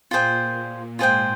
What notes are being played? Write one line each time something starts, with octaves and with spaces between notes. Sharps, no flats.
A#2 F4 G#4 C5 G5
A#2
G#2 F4 G#4 C5 G5